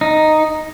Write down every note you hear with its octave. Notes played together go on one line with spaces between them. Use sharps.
D#4